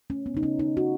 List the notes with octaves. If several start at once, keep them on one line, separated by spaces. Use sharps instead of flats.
A3 C#4
B3
C#3 D#4
C#4
C#3 D#4
F#4